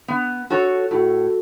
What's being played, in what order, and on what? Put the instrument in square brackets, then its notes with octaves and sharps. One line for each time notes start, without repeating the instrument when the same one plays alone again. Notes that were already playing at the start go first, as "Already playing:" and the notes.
[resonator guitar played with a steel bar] B3
F#4 A4 C#5
[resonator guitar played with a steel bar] A2 [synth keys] F#4 A4